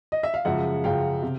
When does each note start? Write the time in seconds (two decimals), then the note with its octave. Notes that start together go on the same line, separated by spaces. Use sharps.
0.12 D#5
0.23 E5
0.34 F5
0.45 F#2 C#3 F3 G#3 E5 F#5
0.84 F#2 C#3 F3 G#3 F5 G5
1.22 C3